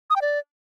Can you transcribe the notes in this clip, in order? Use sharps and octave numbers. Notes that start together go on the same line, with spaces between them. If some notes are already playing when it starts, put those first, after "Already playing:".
D#6
G5
D5